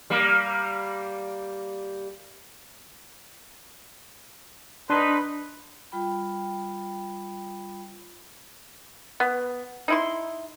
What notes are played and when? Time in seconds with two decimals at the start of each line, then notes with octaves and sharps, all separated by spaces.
0.10 G3 A#3
4.90 D4 D#4 B4 C6
5.92 G3 F4 G5 B5
9.20 B3
9.88 D#4 E4 C6